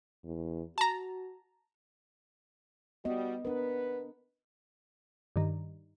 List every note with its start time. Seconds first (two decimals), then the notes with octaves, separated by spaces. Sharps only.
0.24 E2
0.78 F#4 A5 A#5
3.05 G3 B3 F#4 D#5
3.45 B3 D4 A#4 B4
5.36 G2 D#3